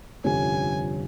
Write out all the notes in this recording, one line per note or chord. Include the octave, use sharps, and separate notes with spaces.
G1 F2 C3 G3 C#4 G#5